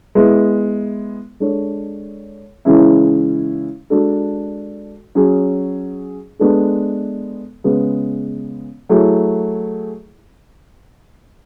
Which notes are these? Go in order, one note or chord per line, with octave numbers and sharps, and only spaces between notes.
G#3 B3 E4
G#3 D4 A4 C#5
C#3 E3 G#3 C#4 E4
G#3 D4 F#4 A4
F#3 C#4 G#4
G#3 B3 D4 A4
C#3 G#3 B3
F#3 A3 E4 G#4